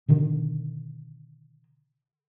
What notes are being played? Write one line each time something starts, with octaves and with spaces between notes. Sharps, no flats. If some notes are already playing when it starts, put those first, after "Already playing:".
B2 D3 D#3